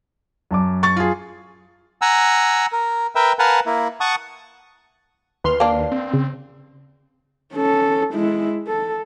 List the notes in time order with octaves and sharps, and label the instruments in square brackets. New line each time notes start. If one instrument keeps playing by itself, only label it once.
[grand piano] F#2 A5 D6
[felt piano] C#6 A6
F4 G#4
[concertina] F#5 G#5 A#5 E6
A#4
A#4 B4 E5 G5
A#4 B4 F5 F#5 G#5 A5
A#3 E4
F#5 A5 C#6 D#6
[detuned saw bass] D#2 [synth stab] B4 C6 F6
[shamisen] A#3 D4
[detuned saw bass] C4
[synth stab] C#3
[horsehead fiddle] C#4 A4
G#3 E4
A4